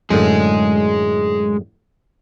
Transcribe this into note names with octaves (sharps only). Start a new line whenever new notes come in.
F#2 A2 D3 G#3 G#4